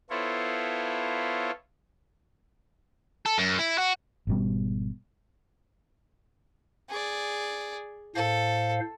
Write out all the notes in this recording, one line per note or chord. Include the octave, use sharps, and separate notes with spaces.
B3 E4 F4 A4 C5 C#5
A4
F#2
E4
F#4
G#1 B2 G3
G#4 D5
A2 A4 C5 F5